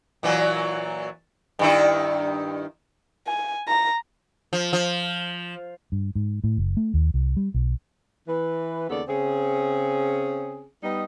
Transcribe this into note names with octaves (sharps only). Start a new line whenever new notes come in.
A#2 E3 F#3
G2 D#3 E4
G#5
A#5
F3
F3
G2
G#2
A2
F#1
A3
D#2
C2
G3
B1
E3 B4
D#2 C#3 B3 A4 D5
C#3 C4 C#4 G#4
G3 B3 D#4 D#5